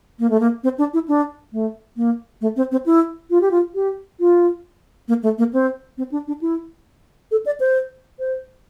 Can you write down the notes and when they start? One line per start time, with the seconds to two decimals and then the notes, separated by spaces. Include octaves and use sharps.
0.19 A#3
0.30 A3
0.40 A#3
0.63 C4
0.78 D4
0.93 E4
1.08 D4
1.53 A3
1.97 A#3
2.41 A3
2.56 C4
2.71 C4
2.86 E4
3.30 F4
3.41 G4
3.51 F4
3.75 G4
4.20 F4
5.08 A#3
5.23 A3
5.38 A#3
5.53 C4
5.98 C4
6.12 D4
6.27 D4
6.41 E4
7.31 A4
7.46 D5
7.60 C5
8.19 C5